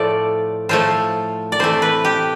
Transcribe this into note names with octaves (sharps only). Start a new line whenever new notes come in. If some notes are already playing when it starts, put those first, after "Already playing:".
Already playing: A2 F3 A3 D5
A2 F3 A3 C5
D5
C3 E3 A3 C5
B4
G4